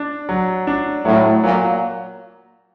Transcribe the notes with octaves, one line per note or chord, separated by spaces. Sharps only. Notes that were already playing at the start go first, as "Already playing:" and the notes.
Already playing: D4
F#3
D4
A2 F#3
A#2 F#3